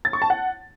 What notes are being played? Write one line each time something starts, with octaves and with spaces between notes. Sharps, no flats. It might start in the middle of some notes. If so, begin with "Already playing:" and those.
A6
C#6
A5
F#5